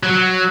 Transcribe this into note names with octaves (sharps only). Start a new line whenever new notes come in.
F#3